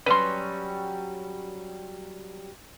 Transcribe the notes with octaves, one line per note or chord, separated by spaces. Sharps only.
F#3 G3 C#4 B4 C6